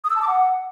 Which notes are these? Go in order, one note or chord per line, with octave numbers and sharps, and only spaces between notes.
D#6
E6
A5
D6
F#5